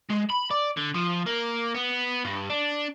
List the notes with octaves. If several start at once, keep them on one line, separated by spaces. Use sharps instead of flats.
G#3
B5
D5
D3
F3
A#3
B3
G2
D4